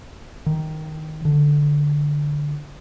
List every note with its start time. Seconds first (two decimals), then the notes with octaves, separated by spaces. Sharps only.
0.46 D#3
1.25 D3